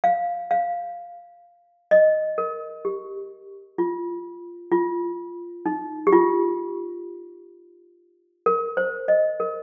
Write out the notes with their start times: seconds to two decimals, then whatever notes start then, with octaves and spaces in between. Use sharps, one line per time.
0.04 F5
0.51 F5
1.91 D#5
2.38 A#4
2.85 G4
3.78 F4
4.72 F4
5.66 D#4
6.07 G4
6.13 F4
8.46 A#4
8.77 C5
9.08 D#5
9.40 A#4